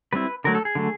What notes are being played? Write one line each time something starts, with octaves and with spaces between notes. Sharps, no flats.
G3 C4 E4 B4
D3 F#3 A3 A#4
A4
G#4
D3 F#3 A3